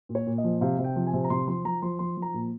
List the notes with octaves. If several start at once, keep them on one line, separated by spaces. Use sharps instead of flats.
A#2
C#5
A#2
D#5
F3
C3 F5
C3
G5
F3
G#5
C3
A#5
C3 C6
F3 C6
F3 A#5
F3 C6
F3 C6
F3
A#5
A#2